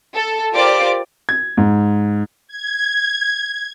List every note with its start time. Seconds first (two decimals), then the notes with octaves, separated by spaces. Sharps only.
0.14 A4
0.54 F4 G4 A#4 C5 D5 D6
1.29 G#6
1.57 G#2
2.48 G#6